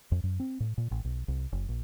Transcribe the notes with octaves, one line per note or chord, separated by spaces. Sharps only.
F2
F#2
C4
A2
A#2
A1
B1
C2
F#1
A#1